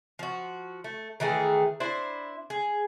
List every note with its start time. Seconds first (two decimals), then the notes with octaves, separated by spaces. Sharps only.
0.19 F3 F#4
0.84 A3
1.20 D#3 E3 A3 G#4
1.80 D4 E4 C5
2.50 G#4